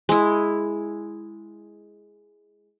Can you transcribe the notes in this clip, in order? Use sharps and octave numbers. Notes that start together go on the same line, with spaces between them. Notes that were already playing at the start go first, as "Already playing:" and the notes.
G#3 E4